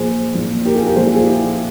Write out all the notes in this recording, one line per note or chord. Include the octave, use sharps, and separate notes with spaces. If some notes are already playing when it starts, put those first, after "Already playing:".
Already playing: A#2 F3 G#4 C5
A#2 F3
G4 A#4
F4 G#4
G4 A#4
A#2 F3 G#4 C5
F4 G#4
F4 G#4
E4 G4